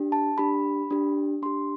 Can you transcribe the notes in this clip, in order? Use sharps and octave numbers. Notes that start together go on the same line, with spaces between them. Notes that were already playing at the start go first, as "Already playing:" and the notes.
Already playing: D4 G4
A5
D4 G4 B5
D4 G4
D4 G4 C6